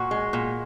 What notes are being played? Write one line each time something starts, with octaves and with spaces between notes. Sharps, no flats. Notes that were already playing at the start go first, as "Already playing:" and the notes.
Already playing: A#2 F#4
G#3
A#2